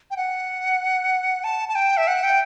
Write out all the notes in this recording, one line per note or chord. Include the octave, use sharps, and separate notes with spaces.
G5
F#5
A5
A5
G5
E5
F#5
G5